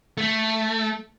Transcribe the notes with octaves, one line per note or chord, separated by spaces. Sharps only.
A3